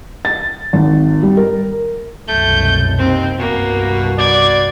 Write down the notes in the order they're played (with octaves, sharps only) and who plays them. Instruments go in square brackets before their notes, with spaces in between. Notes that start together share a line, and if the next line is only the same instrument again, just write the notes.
[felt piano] A6
G#1
G3
A#4
[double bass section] C2 F#2 B2 [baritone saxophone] A3 [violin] G6
[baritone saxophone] D#2 [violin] C4
[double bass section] C2 G2 [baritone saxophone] B2 [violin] A#3
[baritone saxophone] B2 [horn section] D5 [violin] G#6